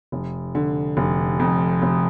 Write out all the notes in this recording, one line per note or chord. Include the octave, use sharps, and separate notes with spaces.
F1
D3
F1
F2
F1